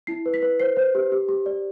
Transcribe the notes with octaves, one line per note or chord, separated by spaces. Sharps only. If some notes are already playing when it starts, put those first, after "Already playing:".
E4 C7
B4
B6
B4
C5 C7
C5
G4
G4
G4
D5